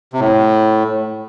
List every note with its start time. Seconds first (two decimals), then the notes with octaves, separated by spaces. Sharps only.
0.13 C3
0.20 A2